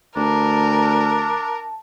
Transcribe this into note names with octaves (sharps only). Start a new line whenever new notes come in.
D2 D4 A#4 A5